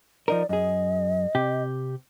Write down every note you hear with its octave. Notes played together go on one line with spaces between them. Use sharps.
F3 D#4 A#4 D5
F#2 G#4 D#5
C3 G4